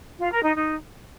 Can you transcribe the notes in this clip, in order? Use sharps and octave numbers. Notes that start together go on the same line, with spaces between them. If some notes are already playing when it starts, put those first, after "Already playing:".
F4
A#4
D#4
D#4